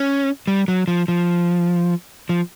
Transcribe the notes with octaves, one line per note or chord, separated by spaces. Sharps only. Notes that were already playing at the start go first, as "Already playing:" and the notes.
Already playing: C#4
G3
F#3
F3
F3
F3